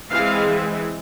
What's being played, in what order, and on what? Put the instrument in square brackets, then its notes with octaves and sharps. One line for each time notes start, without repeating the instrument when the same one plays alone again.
[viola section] E3 G#3 C4 F5